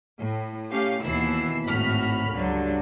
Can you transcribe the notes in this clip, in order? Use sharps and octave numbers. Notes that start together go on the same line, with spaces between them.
A2
A3 C#4 G4 F5
D#2 B2 E3 E4 E6 C7
G#1 A2 F#4 B5 F6 B6
C#2 G2 D3 F#3